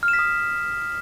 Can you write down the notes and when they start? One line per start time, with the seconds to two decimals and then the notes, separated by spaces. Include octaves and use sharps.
0.03 F6
0.08 E7
0.13 B6
0.19 D#6